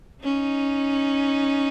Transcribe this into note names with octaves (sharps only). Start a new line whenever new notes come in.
C#4 D#4